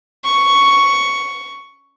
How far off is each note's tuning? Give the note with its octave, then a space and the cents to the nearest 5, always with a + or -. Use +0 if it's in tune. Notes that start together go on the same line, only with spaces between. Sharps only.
C#6 +5